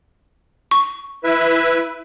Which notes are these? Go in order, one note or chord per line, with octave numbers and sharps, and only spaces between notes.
C#6
E4 B4 E5